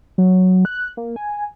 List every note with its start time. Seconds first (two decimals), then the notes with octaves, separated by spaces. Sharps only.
0.18 F#3
0.65 F#6
0.97 A#3
1.16 G#5